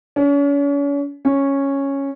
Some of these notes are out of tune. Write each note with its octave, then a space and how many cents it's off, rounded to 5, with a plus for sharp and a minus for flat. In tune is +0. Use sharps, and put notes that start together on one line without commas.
C#4 +40
C#4 -5